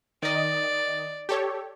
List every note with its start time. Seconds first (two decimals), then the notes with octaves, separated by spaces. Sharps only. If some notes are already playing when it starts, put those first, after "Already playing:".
0.23 D#3 D5 D#5
1.29 G4 A4 C#5